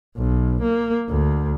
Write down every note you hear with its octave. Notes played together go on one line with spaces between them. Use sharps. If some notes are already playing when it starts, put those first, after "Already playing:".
B1
A#3
D2